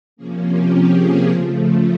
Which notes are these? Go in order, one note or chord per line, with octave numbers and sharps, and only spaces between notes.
C3 F3 A#3 C#4 G#4
G4
G#4
C#3 F3 A3